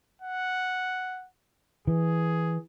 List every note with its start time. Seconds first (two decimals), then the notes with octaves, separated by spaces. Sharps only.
0.22 F#5
1.87 E3 G#4